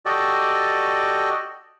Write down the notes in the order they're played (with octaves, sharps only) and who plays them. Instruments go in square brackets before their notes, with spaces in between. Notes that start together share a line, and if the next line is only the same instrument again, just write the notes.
[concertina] F#4 G4 A4 D5 D#5